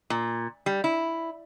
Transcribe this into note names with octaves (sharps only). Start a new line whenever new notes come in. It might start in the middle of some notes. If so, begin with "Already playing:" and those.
A#2
G3
E4